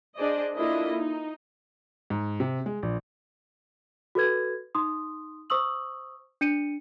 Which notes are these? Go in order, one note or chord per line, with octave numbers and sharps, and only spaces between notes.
D4 G#4 C5 D5 D#5
A#3 D4 E4 F4 A4 D#5
D#4
G#2
C3
G#3
A#1
F#4 A4 B4 G#6
D#4 C6 D#6
C5 C#6 D#6 E6 F#7
D4 C#7 D#7